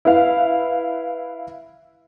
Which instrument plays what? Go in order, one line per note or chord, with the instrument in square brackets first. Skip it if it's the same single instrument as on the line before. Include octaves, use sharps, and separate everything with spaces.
[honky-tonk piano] E4 B4 F5